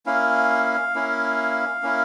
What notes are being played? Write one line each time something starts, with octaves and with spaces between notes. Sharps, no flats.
A#3 C#4 E4 F5
A#3 C#4 E4
A#3 C#4 E4